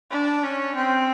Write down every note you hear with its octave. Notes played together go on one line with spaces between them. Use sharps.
D4
C#4
C4